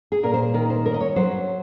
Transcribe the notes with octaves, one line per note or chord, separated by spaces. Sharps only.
G#4
A#2 A#4
C5
D#3 A#4
C5
C#4 A#4
D#5
C#5
F#3 C5